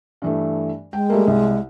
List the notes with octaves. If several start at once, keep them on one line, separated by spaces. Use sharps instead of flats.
G2 E3 A3
G#3 G5
G3 A3 A#3
C2